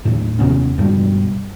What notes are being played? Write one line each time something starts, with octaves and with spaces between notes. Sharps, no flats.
D#2 A2
D#2 C3 B3 C#4
C#2 G2 B2 G3